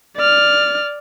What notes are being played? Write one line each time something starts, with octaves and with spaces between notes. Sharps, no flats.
D5 F6